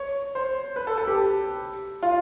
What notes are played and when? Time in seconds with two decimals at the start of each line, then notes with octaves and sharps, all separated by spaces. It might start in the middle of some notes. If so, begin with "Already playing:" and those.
Already playing: C#5
0.35 C5
0.76 B4
0.87 A4
0.98 A4
1.08 G4
2.03 F4